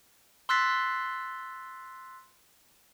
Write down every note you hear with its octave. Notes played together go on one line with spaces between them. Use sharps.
C6 E6 F#6 A6 B6 C7